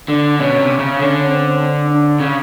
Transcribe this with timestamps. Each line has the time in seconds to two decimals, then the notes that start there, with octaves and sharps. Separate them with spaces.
0.08 D3 D4
0.39 B2 C#4
0.59 C3
0.79 C#3
0.99 D3 C#4
1.30 C4
1.59 D4
1.90 D4
2.20 C#3